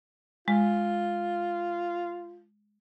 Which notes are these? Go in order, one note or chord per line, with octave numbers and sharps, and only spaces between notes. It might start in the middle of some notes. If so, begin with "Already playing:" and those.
G#3 F4